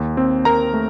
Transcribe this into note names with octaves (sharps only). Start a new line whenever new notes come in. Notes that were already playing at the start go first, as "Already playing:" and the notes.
Already playing: D#2
C4
C4 A#4 A#5
A3